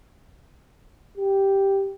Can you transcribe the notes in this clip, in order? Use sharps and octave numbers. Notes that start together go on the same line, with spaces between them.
G4